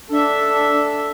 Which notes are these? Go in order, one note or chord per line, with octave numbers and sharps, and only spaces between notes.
D4 A4 E5